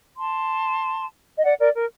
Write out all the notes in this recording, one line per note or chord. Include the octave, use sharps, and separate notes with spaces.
A5 C6
D#5
D5 F#5
A#4 D5
A#4